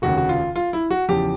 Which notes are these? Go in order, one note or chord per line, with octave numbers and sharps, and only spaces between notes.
F1 D#2 C#3 F#4
F#4
F4
F4
E4
F#4
E2 C#3 F3 G4